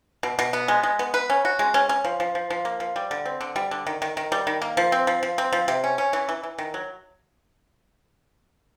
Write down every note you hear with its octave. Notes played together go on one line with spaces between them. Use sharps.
B2
B2
B3
G#3
G#3
B3
B4
C#4
F#4
G#3
C#4
C#4
F3
F3
F3
F3
A#3
F3
G3
D3
C4
D3
G3
D3
D#3
D#3
D#3
G3
D#3
A#3
F3
C4
F3
F3
C4
F3
C3
C#4
C#4
E3
E3
E3
D#3
F#3